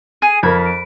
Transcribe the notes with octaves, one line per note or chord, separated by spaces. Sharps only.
G#4 D#7
F2 A#4 B5 G#6
D7